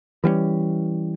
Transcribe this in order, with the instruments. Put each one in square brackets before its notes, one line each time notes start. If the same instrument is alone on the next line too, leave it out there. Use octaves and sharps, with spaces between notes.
[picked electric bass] E3 G3 B3 C#4